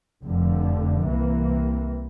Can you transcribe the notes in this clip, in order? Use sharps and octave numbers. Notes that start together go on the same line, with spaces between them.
F1 F2 D3 F3
C2 C3 E3 A#3